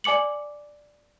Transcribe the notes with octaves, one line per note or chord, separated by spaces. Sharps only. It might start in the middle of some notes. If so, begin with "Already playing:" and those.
D5 G#5 D6 C#7 F#7